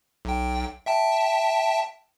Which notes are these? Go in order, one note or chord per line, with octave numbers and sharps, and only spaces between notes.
B1 G5
E5 G5 A5